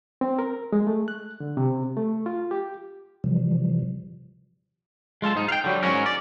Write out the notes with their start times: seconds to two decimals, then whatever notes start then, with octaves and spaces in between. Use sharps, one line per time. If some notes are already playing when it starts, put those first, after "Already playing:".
0.21 C4
0.39 A#4
0.73 G#3
0.87 A3
1.08 F#6
1.40 D3
1.57 C3
1.97 A3
2.26 F4
2.51 G4
3.24 C3 E3 F3 G3
5.22 G#3 F4 A4 A5
5.35 G#2 D#4
5.49 F5 G5
5.64 D3 F#3 G3
5.83 G#2 F#3 C#4 A#4
6.06 D5